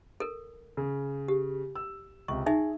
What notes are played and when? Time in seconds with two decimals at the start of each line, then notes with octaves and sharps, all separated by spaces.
0.20 A4 A#4
0.77 C#3
1.28 G4
1.75 E6
2.28 C#2 C3 C#6
2.46 D#4 G#4 E5 G#5